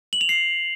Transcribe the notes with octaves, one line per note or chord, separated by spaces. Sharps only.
F#7
F7
C7